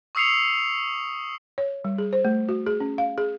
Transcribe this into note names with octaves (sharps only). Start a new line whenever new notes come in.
C#6 D#6 E6 C7 C#7 F7
C#5
G3
G#4
C5
A3
F#4
G#4
C#4
F5
G#4